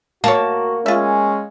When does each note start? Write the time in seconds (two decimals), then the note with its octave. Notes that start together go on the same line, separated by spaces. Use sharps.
0.24 A#3 F#4 C#5 A5
0.86 G#3 C#4 F4 E5